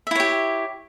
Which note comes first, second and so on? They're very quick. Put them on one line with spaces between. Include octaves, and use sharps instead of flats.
E5 E4 C#5 G4